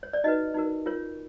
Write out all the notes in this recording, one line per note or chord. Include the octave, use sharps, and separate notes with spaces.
C#5
D5
D#4 F#4 B4 D#5
D#4 F#4 A#4
F4 A#4 C#5